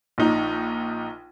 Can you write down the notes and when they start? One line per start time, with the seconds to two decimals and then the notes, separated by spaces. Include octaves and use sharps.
0.18 A#1 D#4